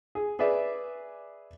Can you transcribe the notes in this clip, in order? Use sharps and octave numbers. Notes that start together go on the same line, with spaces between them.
G#4
G#4 B4 D5 E5